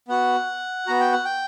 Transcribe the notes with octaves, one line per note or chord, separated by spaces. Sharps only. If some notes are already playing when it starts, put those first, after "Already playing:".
B3 F#4 F#5
B3 F#4 A#5
G5
F#5
G5